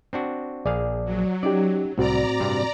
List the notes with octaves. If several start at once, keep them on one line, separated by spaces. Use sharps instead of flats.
C4 D4 F#4
A#1 G#4 D5 F5
F#3
C#4 D#4 G4 D5
C2 A2 C4 F#4 D5 A#5
G2 C3